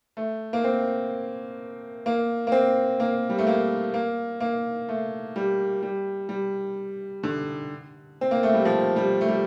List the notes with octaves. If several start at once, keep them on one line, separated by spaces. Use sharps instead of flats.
A3
A#3
C4
A#3
A#3
C4
A#3
G3
A3
A#3
A#3
A#3
A3
G3
G3
G3
D3
C4
A#3
A3
G3
F3
G3
A3
G3